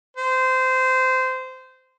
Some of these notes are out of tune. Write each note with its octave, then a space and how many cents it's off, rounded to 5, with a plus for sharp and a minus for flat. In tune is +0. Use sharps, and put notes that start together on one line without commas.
C5 -20